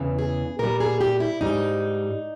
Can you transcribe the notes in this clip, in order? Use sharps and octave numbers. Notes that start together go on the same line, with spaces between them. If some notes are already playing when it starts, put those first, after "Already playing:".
Already playing: E2 C#3 E3
G#4
A#2 G3 A#4
G#4
G4
E4
G#2 G3 D#4